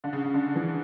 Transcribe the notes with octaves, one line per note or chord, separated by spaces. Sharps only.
D3
C#3
C#3
D3
E3